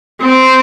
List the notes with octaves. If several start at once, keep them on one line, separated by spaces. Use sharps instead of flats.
C4